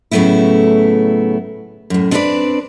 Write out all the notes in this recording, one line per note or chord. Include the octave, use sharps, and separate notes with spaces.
A2 C#3 F#3 A3 B3 E4
F#2 A2
C4 D4 E4 F4 B4 D5